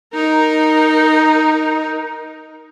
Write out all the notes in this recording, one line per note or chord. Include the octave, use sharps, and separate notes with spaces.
D#4 A#4